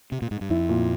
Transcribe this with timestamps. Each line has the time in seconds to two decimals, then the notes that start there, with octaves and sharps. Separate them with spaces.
0.12 C3
0.22 A#2
0.31 G#2
0.41 G2
0.50 F2 E4
0.69 A#2